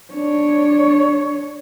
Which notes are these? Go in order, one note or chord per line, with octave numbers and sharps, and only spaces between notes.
D4 C#5